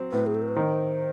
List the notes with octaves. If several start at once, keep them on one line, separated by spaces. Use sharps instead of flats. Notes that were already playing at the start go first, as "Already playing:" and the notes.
Already playing: F#3 C4
A2 B4
G#4
A4
A#4
B4
D#3 C5